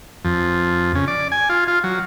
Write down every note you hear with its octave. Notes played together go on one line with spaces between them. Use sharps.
F2
C#3
D5
G#5
F4
F4
F#3